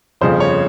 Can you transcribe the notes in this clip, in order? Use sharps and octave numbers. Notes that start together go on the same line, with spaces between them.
G1 F2 C#3 F3 C5
C#5